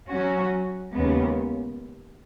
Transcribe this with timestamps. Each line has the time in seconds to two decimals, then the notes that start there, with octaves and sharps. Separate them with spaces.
0.13 F#3 C#4 F#4
0.95 D#2 C#3 G#3 B3